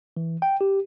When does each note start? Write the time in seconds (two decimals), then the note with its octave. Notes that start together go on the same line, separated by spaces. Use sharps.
0.17 E3
0.42 G5
0.61 G4